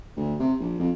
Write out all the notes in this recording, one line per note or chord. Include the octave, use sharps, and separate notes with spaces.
D2
C3
A#1
F2